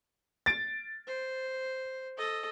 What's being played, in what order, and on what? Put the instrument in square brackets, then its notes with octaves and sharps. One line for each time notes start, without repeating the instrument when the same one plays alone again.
[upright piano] A6 D7
[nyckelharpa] C5
A4 D#5